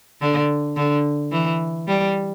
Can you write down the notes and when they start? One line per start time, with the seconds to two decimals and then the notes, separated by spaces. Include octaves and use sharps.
0.21 D3
0.76 D3
1.32 E3
1.88 G3